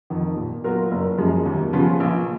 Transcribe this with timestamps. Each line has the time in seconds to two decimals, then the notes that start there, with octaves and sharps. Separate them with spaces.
0.10 F2 D#3
0.36 A#2
0.64 F#3 B3 F4 A#4
0.91 F#1
1.18 F#2 F3 G#3
1.46 D#2
1.73 C#3 F3 B3 F4
2.00 A#1